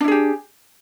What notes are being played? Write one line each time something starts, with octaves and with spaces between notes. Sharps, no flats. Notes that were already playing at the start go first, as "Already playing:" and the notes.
D4 E4 G4 G#4